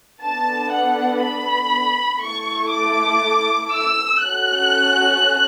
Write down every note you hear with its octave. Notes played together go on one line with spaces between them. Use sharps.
B3 D4 A4 A5
F#5
B5
A3 E4 A4 C#6
D6
E6
C#4 F#4 A4 F#6